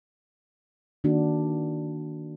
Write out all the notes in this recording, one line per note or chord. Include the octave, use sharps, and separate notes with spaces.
D#3 A#3 D4 F#4